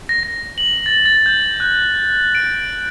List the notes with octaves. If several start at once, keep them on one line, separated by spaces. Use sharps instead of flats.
A#6
A#6
F#7
A6
A6
G6
F#6
D7